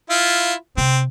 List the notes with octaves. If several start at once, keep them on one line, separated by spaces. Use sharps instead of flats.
E4 F4
C3 C4